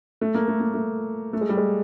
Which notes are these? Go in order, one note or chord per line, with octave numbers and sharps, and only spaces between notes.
A3
A#3
A3
A#3
A3
A3
G#3
G3
G#3